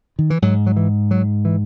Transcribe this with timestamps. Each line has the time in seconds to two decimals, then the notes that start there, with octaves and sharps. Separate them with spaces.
0.19 D#3
0.30 E3
0.42 G#2 F#3
0.67 F#3
0.76 E3
1.11 F#3
1.45 E3